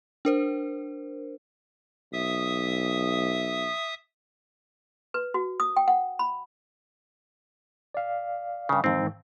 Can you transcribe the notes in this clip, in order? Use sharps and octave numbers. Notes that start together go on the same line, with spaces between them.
D4 A#4 C5
B1 E5 D#6
B4
F#4
D#6
G5
F#5
B5
D5 F5
G2 C#3
F2 G#2 D#3 E3 C4